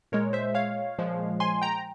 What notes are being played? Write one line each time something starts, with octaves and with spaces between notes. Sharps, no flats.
A#2 G#3 A#4 C#5
C5 E5
C#5 F5
A#2 F3 G#3
G#5 C6
G5 A#5